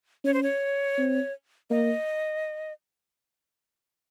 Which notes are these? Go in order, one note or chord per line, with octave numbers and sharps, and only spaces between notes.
C#4 C#5
C5
C#5
C4
A#3 D#5